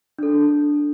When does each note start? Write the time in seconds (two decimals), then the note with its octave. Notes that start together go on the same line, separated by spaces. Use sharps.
0.19 D4 A4